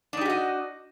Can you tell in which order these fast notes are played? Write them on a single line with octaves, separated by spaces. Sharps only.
D4 D#4 G4 F#4 D#5